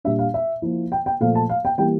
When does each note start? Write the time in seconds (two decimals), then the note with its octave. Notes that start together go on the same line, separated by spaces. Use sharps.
0.04 A#2 G3 D4 E5
0.19 F5
0.34 E5
0.62 F3 A#3 E4
0.92 G5
1.06 G5
1.21 A#2 F3 A3 F5
1.35 A5
1.50 F5
1.65 G5
1.78 E3 G3 A#3 G5